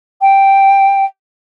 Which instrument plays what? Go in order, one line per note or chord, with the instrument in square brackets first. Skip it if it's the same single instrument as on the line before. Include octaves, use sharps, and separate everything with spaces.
[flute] G5